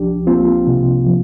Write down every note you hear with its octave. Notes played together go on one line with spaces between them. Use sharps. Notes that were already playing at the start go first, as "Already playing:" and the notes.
Already playing: C2 F3 D4 G4
A#3 C4 F4
C3
F3